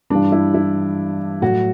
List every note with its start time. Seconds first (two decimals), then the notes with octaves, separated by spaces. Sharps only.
0.10 G2 E3 G3 D4
0.32 E4
0.54 E4
1.42 A2 F#3 F#4